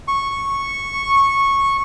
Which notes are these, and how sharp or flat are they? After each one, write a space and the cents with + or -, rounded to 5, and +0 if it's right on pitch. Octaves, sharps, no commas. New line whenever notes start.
C#6 -10